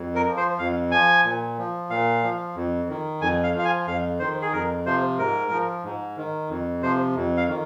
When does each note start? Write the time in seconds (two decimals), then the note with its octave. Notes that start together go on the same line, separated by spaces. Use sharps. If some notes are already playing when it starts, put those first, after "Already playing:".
Already playing: F2
0.15 A#4
0.26 F3
0.37 C5
0.59 F2 F5
0.91 F3 G#5
1.24 A#2
1.58 F3
1.90 A#2 F5
2.23 F3
2.55 F2
2.89 D#3
3.21 F2 G#5
3.43 F5
3.54 F3
3.59 F5
3.65 G#5
3.87 F2 F5
4.19 D#3 C5
4.42 G#4
4.53 F2 A#4
4.86 C3 F3 C5
5.18 G#2 A#4
5.51 F3
5.84 G#2
6.17 D#3
6.49 F2
6.82 C3 F3 C5
7.16 F2
7.37 F5
7.48 D#3